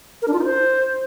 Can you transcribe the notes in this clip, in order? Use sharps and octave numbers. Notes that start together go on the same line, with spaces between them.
A#4
D4
F4
D#4
C5